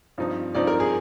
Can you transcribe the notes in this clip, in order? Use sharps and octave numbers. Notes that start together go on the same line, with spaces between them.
G2 F3 C4 D#4
G2 F3 C4 D#4 D5
A#4
G#4